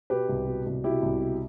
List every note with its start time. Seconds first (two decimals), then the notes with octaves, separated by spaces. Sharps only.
0.10 B2 G4 B4
0.29 C2
0.47 B2
0.66 C2
0.84 B2 E4 G4
1.03 C2
1.22 B2